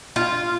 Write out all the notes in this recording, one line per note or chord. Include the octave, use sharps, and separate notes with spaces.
F4